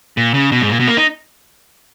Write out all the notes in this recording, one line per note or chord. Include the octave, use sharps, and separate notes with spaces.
A#2
C#3
B2
G#2
A#2
B2
A#3
D#4